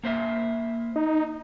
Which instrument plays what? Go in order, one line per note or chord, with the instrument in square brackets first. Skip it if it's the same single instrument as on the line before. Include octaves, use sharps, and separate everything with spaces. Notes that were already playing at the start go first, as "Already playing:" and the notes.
[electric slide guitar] A#3 C5 E5
[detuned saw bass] D#4